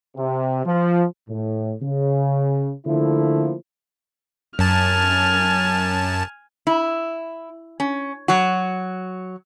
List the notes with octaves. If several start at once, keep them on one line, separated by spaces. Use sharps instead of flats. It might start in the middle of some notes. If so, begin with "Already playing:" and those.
C3
F3
A2
C#3
D3 F3 A3 A#3 E4
F#2 G#5 A5 F6
E4
C#4
F#3 F#4